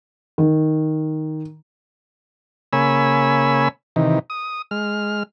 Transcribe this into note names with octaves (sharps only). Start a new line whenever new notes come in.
D#3
C#3 A#3 C#5 G#5 B5 E6
C3 D#3 E3 D#4
D#6
G#3 F6